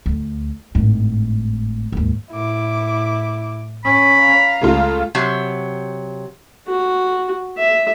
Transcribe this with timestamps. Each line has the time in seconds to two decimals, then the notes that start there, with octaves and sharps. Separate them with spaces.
0.06 D2
0.75 G#1 A2
1.92 D#2 G#2
2.31 A2 E4 D6
3.85 C#4 B5
4.20 F5 A#5
4.61 C#2 C#3 A3 F4
5.15 C3 F#3
6.68 F#4
7.58 E5